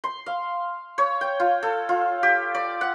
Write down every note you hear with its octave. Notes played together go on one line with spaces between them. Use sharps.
C6
F5
C#5
G5
F4
A4
F4
G4
D5
F#5